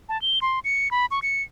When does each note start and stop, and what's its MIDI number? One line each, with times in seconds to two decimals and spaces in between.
0.09 0.20 81
0.22 0.39 103
0.42 0.59 84
0.64 0.91 97
0.91 1.06 83
1.11 1.20 85
1.22 1.43 97